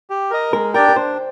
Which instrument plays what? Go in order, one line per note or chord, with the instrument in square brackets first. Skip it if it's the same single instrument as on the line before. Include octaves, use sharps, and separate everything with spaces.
[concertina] G4
A#4 D#5
[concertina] G#3 [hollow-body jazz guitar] A#4
[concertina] D4 G4 D5 G5 [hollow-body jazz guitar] A#4
[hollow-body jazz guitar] A#4
[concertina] D4 [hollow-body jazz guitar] C5